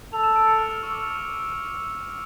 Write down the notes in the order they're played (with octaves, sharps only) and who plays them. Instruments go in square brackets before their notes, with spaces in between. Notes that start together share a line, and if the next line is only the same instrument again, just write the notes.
[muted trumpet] A4 [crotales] F7
[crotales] E7
D7
C#7
F6
E6
C#6
D6
E6